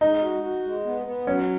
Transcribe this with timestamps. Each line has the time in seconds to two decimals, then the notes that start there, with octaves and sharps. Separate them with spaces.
0.01 G#3 D#4
0.23 F#4
0.43 F#4
0.64 G#3
0.85 B3
1.07 B3
1.27 F#3 C#4